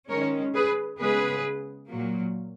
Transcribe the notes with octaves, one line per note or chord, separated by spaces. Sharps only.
D#3 G#3 C#4 A#4 C#5
G#4 B4
C#3 G#3 B3 G#4 B4
A#2 F#3 A#3